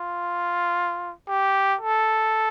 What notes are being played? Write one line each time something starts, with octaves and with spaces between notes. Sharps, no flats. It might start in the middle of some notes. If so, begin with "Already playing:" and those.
Already playing: F4
G4
A4